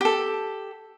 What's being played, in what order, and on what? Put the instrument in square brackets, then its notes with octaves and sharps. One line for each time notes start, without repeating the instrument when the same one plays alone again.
[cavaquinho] G4 A4